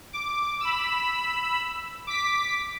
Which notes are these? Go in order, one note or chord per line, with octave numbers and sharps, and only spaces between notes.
D6
B5 E6
D6 B6